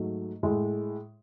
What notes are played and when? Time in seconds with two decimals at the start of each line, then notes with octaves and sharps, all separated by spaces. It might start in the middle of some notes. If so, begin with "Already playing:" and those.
Already playing: G#2 F#3 A3
0.43 A2 G#3